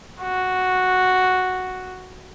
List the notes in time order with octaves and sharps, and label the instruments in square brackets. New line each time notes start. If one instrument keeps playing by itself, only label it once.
[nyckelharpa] F#4